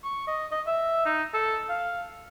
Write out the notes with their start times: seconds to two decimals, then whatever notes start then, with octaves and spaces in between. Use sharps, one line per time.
0.04 C#6
0.27 D#5
0.52 D#5
0.67 E5
1.06 D#4
1.34 A4
1.69 F5